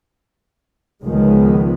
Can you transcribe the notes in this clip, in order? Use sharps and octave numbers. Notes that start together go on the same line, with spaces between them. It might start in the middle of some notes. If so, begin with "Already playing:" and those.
C#2 D#3 F3 G#3 B3